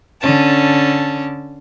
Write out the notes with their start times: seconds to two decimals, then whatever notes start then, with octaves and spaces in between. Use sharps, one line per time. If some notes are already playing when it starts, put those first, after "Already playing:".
0.20 D3 C#4 A5